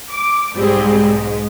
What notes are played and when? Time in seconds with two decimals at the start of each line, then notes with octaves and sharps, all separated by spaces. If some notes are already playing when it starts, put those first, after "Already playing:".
0.11 D6
0.54 B1 G#2 G3 C4 G#4
1.14 G#3